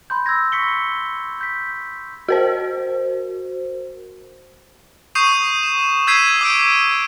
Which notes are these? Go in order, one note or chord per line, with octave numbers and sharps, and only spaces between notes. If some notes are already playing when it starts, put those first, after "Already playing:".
B5 C6 G6
E6 G6 G#6 A#6
C#6 B6 C#7 G7
G6 B6
F#4 A#4 C5
C#6 D#6 G6 C7 D#7 F7
E7
E6 G6 G#6 B6 C7 D#7
D6 E6 D7